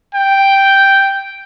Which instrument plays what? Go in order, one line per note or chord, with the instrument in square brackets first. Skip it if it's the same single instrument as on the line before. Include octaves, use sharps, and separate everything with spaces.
[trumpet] G5